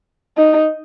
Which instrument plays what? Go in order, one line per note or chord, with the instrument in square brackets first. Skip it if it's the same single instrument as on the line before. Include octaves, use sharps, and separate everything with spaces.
[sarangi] D#4